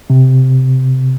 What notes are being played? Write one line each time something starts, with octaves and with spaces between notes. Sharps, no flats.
C3